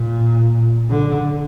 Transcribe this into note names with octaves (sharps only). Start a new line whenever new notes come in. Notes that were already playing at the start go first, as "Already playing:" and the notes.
Already playing: A#2
D3